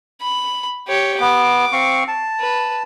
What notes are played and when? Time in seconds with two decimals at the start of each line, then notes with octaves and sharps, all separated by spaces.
0.20 B5
0.87 G4 C#5
1.20 B3 D6
1.73 C4 F5 C#6
2.08 A5
2.40 B4